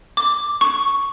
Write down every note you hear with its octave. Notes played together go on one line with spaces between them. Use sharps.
D6
C#6